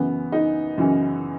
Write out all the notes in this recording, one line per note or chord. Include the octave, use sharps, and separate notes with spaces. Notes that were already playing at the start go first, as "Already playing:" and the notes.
Already playing: F#2 C#3 E3 B3
D#4
F#2 C#3 E3